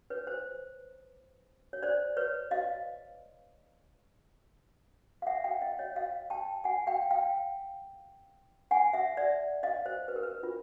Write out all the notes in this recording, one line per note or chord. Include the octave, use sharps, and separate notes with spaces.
B4 C#5
C5
C#5
C5 D5
B4 C#5
D#5 F5
F5
E5 F#5
F5 G5
D#5 F5
C#5 D#5
D#5 F5
G5 A5
F#5 G#5
F5 G5
F5 G5
F#5 G#5
E5 F#5
D5 E5
D#5 F5
C5
B4
A#4
B4
F4